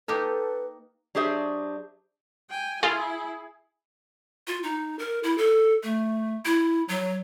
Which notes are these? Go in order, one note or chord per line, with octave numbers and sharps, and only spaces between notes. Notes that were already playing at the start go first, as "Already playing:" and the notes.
A#3 D#4 G4 A4 B4
F#3 D4 G4 G#4 C5 E5
G5 G#5
E4 F4 G#4
F4
D#4
A#4
E4
A4
A3
E4
F#3